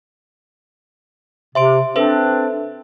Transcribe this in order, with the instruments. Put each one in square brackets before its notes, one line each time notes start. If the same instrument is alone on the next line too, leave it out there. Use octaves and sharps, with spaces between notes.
[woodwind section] C3 [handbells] E5 C6 D7
[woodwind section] C4 D4 [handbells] A4 B4 E5